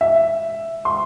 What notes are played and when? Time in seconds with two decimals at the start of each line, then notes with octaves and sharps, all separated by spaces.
0.01 E5
0.85 C6